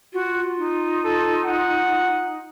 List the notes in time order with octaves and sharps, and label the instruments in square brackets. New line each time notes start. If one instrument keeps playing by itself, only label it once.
[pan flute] F4 [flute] F#4
[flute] D#4
[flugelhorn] A4
F#5